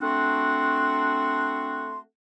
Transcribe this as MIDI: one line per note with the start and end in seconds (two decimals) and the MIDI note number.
0.01 1.98 57
0.01 1.98 60
0.01 1.98 62
0.01 1.98 66
0.01 1.98 78
0.01 1.98 84